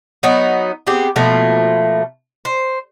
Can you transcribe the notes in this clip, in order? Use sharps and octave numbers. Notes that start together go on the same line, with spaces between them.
F#3 B3 D#4
B3 C4 G4 G#4
B2 F3 A3 A#3
C5